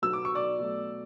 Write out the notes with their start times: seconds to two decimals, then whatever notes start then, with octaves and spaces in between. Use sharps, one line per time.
0.02 B2 F#3 B3 E6
0.13 D6
0.25 C#6
0.35 D5 D6
0.58 B2 F#3 A3